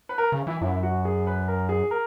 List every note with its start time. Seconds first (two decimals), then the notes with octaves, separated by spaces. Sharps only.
0.09 B4
0.18 A#4
0.32 C#3
0.47 E3 E4
0.61 F#2 E4
0.83 F#4
1.05 G#4
1.27 B4
1.48 A#4
1.69 G#4
1.91 A#4